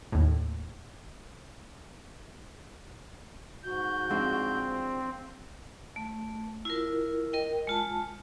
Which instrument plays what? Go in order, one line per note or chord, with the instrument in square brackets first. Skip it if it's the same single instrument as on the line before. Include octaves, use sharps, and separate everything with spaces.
[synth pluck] D#2 A2
[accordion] G#2 G6 [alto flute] F#4
[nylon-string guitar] F3 G#3 D4 [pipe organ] C4
[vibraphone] A3
E4 F4 A#4
A#4 D#5 G5
G#3 F4 A5